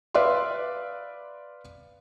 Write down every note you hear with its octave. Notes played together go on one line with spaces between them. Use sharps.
B4 D5 E5 F5 C6